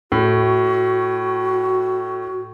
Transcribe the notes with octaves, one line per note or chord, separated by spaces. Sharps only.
A2 F#4